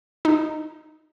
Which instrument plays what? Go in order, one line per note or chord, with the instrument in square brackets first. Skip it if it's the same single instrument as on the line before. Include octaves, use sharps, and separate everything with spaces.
[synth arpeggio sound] D#4